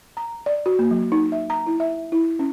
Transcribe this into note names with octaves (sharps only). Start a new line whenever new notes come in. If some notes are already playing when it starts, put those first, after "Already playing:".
A#5
D5
F#4
A#3
F#3
D#4
E5
A#5
E4
E5
E4
C#4